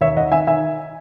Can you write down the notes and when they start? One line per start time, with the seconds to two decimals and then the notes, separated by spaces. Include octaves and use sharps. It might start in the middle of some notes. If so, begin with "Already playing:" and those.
0.01 D#2 C#5 E5
0.16 D#3 D#5 F#5
0.32 D#3 E5 G#5
0.47 D#3 E5 G#5